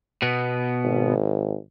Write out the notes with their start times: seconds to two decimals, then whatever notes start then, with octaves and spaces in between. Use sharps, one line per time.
0.22 B2 B3
0.84 G#1